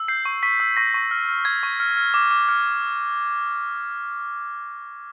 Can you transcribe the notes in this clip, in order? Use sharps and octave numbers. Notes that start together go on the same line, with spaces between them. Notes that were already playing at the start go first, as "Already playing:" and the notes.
Already playing: E6
G6 C7
C#6
C#6 B6
E6
C#6 A#6
C#6
F6
F6
C#6 G#6
C#6
F6
F6
D6
D6
F6